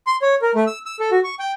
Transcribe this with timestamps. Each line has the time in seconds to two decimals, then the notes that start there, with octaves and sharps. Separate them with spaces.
0.07 C6
0.22 C#5
0.42 A#4
0.55 A3
0.67 E6
0.86 E6
1.00 A4
1.12 F#4
1.24 C#6
1.39 G5